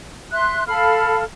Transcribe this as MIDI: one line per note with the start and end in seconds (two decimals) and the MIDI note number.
0.33 0.64 76
0.33 0.64 84
0.33 0.64 90
0.67 1.23 69
0.67 1.23 77
0.67 1.23 83
0.67 1.23 89